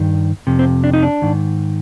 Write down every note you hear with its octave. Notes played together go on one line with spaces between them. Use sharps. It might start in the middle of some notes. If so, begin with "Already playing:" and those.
Already playing: G2 D#3
F2 C3
C4
D4
D#4
D4
G#2 D#3